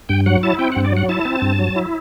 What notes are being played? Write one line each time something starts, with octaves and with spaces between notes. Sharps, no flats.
G2 G5
F#3 F#5
E4 A5
C4 G5
F#5
G2
D5
F#3 F#5
E4 A5
C4
G2
F#3
E4